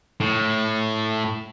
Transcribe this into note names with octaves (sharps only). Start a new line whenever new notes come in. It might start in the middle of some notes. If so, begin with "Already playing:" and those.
A2